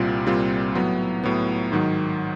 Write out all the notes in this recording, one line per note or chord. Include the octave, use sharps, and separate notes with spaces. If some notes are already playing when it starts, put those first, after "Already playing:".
Already playing: C2 A#2 G3 C4 F4
C2 A#2 G3 C4 F4
A2 F#3 B3
A2 F#3 B3
G#2 D#3 F#3